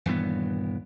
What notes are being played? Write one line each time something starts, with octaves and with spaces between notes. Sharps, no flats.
D#1 G2 E3 B3